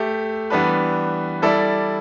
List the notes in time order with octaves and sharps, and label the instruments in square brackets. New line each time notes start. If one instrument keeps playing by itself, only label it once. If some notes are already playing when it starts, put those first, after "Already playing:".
Already playing: [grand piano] A3 G4 E5
E3 G3 B3 D4 B4
G3 E4 A4 D5